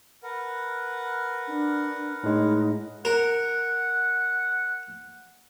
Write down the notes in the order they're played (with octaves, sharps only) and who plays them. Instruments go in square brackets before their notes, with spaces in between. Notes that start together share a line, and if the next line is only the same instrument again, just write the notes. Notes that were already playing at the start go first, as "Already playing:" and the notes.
[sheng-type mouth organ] A#4 B4 F#5
[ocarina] D4
[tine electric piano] A2 G#3 [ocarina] D#4
[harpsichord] A#4 [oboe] F#5